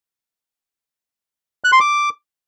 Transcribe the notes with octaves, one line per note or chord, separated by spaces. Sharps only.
F#6
C6
D6